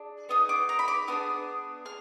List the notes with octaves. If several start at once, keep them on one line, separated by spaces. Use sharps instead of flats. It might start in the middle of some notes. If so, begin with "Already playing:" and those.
Already playing: D4 G#4
B3 D#4 G#4 D#6
D6
A#5
B5
D6
B3 D4 G#4 D#6
G#4 F6